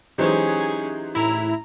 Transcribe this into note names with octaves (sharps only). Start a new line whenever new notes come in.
E3 F#3 G#3 C#4 D#4 G4 G#4 C5
A2 E4 A#5